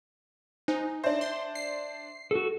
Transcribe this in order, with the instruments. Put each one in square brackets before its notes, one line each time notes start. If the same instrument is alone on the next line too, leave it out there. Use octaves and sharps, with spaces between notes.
[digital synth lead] D#4 [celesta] C5 G#5
[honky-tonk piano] D4 C5 [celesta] E5
[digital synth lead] C6
C7
[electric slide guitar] F#4 A4